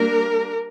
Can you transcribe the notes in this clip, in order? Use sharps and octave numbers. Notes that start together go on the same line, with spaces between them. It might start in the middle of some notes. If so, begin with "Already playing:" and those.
Already playing: G3 A#3 D4 A#4